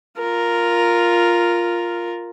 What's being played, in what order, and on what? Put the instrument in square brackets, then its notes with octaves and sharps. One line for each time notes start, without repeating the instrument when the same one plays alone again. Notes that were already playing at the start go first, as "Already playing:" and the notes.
[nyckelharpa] F4 A#4